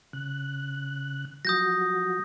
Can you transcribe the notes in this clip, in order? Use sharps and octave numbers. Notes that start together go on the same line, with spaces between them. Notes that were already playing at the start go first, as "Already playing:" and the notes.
C#3 F#6
F3 F#3 F#4 D#6 G6 A#6